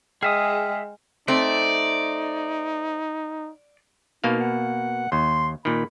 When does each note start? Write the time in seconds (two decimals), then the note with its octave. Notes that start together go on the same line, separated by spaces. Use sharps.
0.23 G#3 G#4 E5 G5 D#6 F6
1.28 A3 C4 D#4 D5
4.24 B2 A#3 D#4 F5
4.41 F#5
5.12 D#2 C6
5.65 A#2 D#3 B5